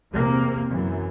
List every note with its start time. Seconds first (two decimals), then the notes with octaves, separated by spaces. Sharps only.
0.13 E2 C3 A#3 C4
0.70 F#2 E3